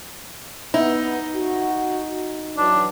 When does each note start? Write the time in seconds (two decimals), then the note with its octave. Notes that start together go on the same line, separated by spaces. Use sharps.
0.74 B3 D#4 E4
1.34 F#4
2.57 E3 F#3 D4